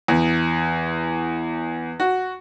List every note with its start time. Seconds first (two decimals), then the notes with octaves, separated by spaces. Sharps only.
0.08 E2
2.00 F#4